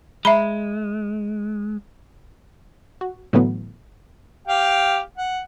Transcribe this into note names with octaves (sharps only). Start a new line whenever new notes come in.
G#3 E5 A#5 B5
F#4
A2 D3 E3 F#3 A3 B3
G4 F5 G5
F#5